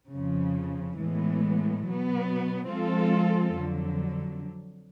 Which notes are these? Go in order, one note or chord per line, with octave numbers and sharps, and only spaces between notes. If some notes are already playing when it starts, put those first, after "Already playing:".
F2 C#3 F3
A2 E3 G#3 B3
B2 F#3 B3
F3 G#3 C4 F4 A4
F2 D3 F#3